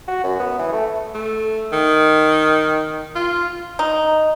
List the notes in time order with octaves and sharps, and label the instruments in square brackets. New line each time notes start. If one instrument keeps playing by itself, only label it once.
[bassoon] F#4
F#2
B3
E3
A3
[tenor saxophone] A3
D#3
F4
[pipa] D#4